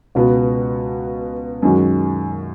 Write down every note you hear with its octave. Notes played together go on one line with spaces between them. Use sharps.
C#2 B2 B3 F#4
F#2 D#3 G#3 C#4 F#4